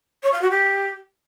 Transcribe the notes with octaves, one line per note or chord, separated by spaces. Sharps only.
C#5
F5
F#4
G4